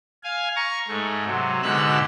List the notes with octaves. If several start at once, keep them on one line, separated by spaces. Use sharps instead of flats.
F5 G#5
A#5 C#6
G#2 A3
C3 F#3
G#2 B2 D3 G4 E6 F#6